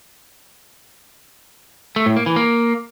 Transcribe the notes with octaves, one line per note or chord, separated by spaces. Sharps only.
A3
A2
A#3
E3
A#3